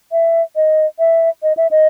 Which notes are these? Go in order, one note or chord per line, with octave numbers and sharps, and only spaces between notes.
E5
D#5
E5
D#5
E5
D#5